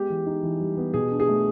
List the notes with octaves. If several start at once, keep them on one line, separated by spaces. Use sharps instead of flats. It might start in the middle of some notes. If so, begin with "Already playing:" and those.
Already playing: G#3 B3 G4
E3
D#4
E3
G3
B3
B2 G#4
D4
G#4
A3